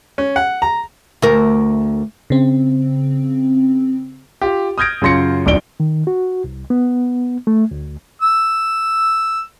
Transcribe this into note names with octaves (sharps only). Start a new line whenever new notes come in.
C#4
F#5
A#5
D2 A#4
C#3 C4
F4 G4
D#6 F6 G6 G#6 A#6 D7
F#2 C#3 F4 C6 A#6 C#7
D#1 B1 F2 D4 D7 G7
D#3
F#4
C2
B3
A3
D2
E6